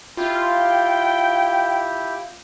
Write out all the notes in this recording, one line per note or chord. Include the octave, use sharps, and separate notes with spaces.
E4 F4 G4 G5